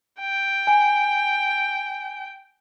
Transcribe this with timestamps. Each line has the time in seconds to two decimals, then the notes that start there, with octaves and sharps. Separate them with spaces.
0.20 G5
0.67 G#5